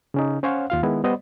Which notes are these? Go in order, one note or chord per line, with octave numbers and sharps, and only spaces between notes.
C#3 C#4 D#4
C#4 C5 C#5 F5 F#5
D#2 F4 F5
D#3 G#3 B3 E4
G3 B3 C5 D5 D#5